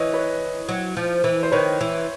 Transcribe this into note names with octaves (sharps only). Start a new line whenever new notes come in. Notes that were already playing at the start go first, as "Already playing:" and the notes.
Already playing: E3 C#5 D#5
B4 C#5
F#3
F3
E3
C5
D#3 B4 C#5
E3